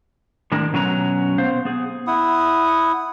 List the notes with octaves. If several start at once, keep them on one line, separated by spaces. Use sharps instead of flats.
A2 D#3 G#3 D4 A#4
B2 F#3 C#4 F#4 G#5 A#5
B3 C5 F5
B3 G#4
E4 F#5 D#6